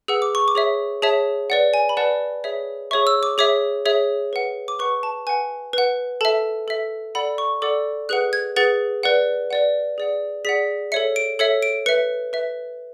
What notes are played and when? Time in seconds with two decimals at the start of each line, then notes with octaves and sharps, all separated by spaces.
0.08 G#4 B4 F#5 E6
0.22 D6
0.35 C#6
0.48 D6
0.55 G#4 C#5 E5
1.02 G#4 C#5 E5 A5
1.50 B4 D5 F#5
1.74 G#5
1.89 B5
1.97 B4 D5 F#5 A5
2.44 G#4 C#5 E5
2.91 G#4 C#5 E5 C#6
3.07 E6
3.23 D6
3.38 G#4 C#5 E5 D6
3.85 G#4 C#5 E5
4.33 B4 F#5
4.68 D6
4.79 B4 F#5 C#6
5.03 A5
5.27 B4 F#5 G#5
5.73 B4 F#5
6.21 A4 E5 A5
6.68 A4 E5
7.15 A4 D5 F#5 B5
7.38 C#6
7.62 A4 D5 F#5 D6
8.09 G#4 B4 F#5 F#6
8.33 G#6
8.56 G#4 B4 F#5 A6
9.03 B4 D5 F#5
9.51 B4 D5 F#5
9.98 G#4 D5 F#5
10.45 G#4 D5 F#5 B6
10.92 A4 C#5 E5 C#7
11.16 D7
11.39 A4 C#5 E5 C#7
11.62 D7
11.86 B4 E5 C#7
12.33 B4 E5